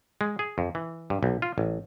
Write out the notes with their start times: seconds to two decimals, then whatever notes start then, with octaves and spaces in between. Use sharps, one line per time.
0.21 G#3
0.39 G#4
0.58 F2
0.75 E3
1.10 G2
1.23 B1
1.42 F4
1.58 A1